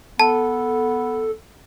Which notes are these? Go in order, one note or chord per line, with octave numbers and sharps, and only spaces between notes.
B3 A4 A5